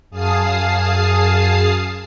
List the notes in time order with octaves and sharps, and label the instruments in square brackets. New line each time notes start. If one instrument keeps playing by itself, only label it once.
[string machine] F#2 G#4 F5 A5 D#6 C7